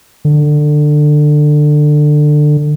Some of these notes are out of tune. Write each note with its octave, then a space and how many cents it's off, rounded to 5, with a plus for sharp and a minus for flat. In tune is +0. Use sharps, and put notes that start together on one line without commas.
D3 +20